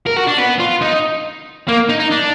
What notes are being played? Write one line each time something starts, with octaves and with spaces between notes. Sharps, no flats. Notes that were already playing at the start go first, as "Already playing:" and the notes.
A#4
F#4
D4
B3
F4
D#4
A#3
D#4
D#4
D4